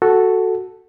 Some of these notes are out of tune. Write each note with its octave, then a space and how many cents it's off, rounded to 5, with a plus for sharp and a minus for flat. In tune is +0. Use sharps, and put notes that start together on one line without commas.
F#4 +0 A4 +0